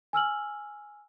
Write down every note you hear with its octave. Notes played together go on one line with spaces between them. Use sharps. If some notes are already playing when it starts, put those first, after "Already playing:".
G#5 E6 F6 F#7